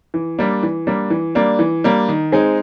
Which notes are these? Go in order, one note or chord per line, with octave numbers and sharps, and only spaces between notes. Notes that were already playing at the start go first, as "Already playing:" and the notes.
E3
G3 A#3 D4
E3
G3 A#3 D4
E3
G3 A#3 D4
E3
G3 A#3 D4
D#3
G#3 C4 D#4 G#4